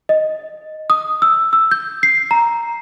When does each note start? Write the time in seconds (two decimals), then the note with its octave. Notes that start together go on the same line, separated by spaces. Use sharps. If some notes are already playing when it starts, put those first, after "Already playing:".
0.09 D#5
0.90 D#6
1.22 E6
1.53 E6
1.71 G6
2.03 C7
2.31 A#5